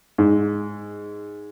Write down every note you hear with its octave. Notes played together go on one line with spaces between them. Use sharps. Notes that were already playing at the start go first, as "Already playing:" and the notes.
G#2